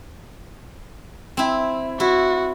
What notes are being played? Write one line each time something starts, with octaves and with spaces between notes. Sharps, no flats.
C4 E4
E4 F#4